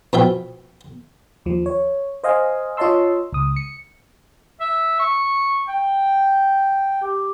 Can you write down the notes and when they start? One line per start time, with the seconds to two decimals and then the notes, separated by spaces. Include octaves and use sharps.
0.13 B2 F3 E5 G5
1.46 D#2 F3
1.66 C#5
2.24 C5 D#5 F5 G#5
2.77 F4 C#5 D#5 A5 C6 E6
3.33 C#2 D#6
3.56 C#7
4.60 E5
4.99 C#6
5.68 G5
7.02 G4